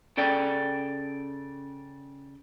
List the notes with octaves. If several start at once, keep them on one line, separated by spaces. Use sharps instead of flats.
C#3 A4 D5 G5